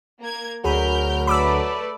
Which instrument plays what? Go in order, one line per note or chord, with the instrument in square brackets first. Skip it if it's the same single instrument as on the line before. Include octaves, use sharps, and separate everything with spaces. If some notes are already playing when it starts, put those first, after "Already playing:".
[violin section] A#3 A#5 G#6
[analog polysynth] D2 [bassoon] F#3 [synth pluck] G#4 B5 [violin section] A#4 F6 G6
[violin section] A3 B4 D5 [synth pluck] B5 D6 E6